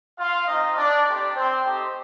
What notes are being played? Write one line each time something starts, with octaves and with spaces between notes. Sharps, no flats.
F4 F5
C4 D#4 F4 D#5
D4 D5
A3 C4 D4 D#4 G4 D5
C4 C5
A3 C4 D#4 G4